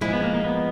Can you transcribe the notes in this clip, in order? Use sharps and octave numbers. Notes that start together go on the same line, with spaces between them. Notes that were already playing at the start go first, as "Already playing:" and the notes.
A#2 F3 G#3 E4
B3
A#3
A#3
B3